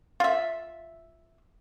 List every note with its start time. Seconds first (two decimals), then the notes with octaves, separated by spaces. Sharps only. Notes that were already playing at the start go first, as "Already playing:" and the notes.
0.20 F4 E5